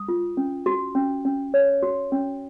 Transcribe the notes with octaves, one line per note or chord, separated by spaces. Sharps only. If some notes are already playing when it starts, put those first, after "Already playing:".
Already playing: D#6
F4
C#4
F#4
C#4
C#4
C#5
F#4
C#4